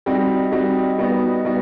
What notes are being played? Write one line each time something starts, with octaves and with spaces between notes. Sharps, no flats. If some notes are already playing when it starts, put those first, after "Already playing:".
G3 C4 D#4 F#4
G3 C4 D#4 F#4
G3 B3 D#4 F#4
G3 B3 D#4 F#4